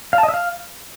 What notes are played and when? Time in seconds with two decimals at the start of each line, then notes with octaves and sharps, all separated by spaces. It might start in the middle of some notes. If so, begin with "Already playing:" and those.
0.13 F5
0.18 A5
0.23 D#5
0.28 E5
0.34 F5